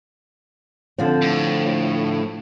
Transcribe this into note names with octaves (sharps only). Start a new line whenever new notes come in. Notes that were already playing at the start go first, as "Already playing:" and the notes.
D3 F3 C4
A2